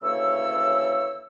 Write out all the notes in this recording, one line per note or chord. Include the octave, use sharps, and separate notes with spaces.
D2 C#3 E3 A#3 C#5 E6